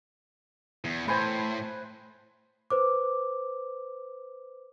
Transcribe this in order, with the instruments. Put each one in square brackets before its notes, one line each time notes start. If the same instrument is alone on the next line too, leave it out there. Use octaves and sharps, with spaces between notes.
[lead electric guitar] E2
[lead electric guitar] A2 [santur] B4 C5 G#5
[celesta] B4 C5 D6